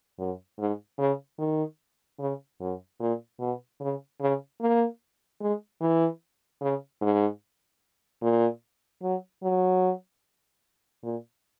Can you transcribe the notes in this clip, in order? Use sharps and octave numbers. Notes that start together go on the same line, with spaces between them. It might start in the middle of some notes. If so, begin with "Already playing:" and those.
F#2
G#2
C#3
D#3
C#3
F#2
A#2
B2
C#3
C#3
A#3
G#3
E3
C#3
G#2
A#2
F#3
F#3
A#2